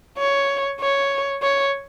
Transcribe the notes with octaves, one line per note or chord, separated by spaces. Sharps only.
C#5
C#5
C#5